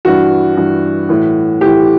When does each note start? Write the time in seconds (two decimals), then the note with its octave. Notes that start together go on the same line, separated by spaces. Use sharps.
0.05 G2 E3 F#4
0.57 G2 E3
1.09 A2 E3
1.61 A2 E3 G4